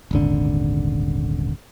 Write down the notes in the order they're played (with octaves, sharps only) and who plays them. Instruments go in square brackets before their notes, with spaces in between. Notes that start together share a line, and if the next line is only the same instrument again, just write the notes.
[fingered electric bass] D#1 G#1 D3